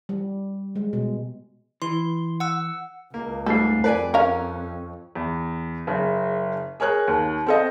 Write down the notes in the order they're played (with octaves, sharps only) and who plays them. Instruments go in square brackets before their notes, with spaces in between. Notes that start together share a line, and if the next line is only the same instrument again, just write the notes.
[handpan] G3
G#3
B2
[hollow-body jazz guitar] E3 [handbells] C6
[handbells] F#5 E6
[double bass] C#2 [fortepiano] A#3
[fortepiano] G#2 G3 [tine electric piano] A3 C7 [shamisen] A4
[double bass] F2 [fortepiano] B4 D5 G#5
[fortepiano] C#4 [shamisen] A#4 F5 [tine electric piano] C#6
[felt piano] E2
F#1 C#3
G#4 A#4 C#5 F#6
D#2
C4 A4 D#5